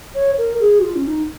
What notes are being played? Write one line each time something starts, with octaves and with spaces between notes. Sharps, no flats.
C#5
A#4
G#4
F#4
F4
C#4
D#4